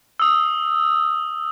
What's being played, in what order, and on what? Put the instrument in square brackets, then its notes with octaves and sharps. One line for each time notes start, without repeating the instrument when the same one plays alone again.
[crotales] D#6 E6